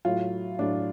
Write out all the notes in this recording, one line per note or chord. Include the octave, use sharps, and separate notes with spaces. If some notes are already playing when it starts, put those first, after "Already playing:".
A2 F#3 F4
A2 F#3 D4